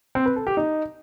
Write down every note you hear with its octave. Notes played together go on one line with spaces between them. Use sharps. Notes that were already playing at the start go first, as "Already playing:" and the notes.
C4
B4
A4
G4
D#4